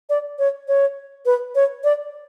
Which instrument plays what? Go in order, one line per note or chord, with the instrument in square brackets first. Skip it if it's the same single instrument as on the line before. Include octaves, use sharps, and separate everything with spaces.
[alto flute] D5
C#5
C#5
B4
C#5
D5